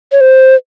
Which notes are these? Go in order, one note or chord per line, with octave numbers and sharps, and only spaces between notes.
C#5
C5